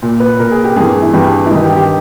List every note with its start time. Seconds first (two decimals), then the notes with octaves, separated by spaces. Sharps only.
0.02 A#2
0.20 B4
0.39 A#2 A#4
0.51 G#4
0.64 G4
0.76 G2 E3 G#4
1.02 E4
1.13 G2 E3 G4
1.46 E4
1.50 G2 D#3 D#4
1.63 G4
1.76 G4